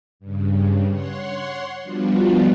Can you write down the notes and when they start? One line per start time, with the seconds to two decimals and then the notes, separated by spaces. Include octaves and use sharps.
0.20 G2 C#3
0.88 C#5 F#5 C6
1.83 F3 G3 B3 D4 F4 F#4